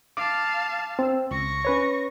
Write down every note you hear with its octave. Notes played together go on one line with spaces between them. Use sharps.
F5 A5 D6
C4 E6
C#2 C#6 A#6
C#4 B4 C#5